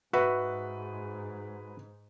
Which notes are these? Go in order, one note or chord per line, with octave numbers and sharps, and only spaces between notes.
G#2 F#4 B4 E5